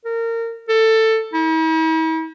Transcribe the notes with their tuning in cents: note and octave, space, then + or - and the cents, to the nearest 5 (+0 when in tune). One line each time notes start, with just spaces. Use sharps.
A#4 -25
A4 +15
E4 -45